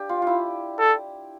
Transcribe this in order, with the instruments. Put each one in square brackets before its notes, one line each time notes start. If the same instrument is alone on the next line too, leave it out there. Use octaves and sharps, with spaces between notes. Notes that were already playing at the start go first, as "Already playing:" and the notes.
Already playing: [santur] D4 G4
F4
E4 F4
[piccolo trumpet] A4